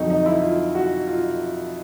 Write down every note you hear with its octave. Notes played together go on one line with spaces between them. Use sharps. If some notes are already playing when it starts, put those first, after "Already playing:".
Already playing: F2 D3 F#3 D#4
D#4
E4
F4
F#4
F4